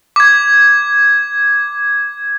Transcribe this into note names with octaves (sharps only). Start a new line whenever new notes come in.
D6 G#6